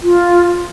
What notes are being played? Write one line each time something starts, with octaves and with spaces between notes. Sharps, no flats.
F4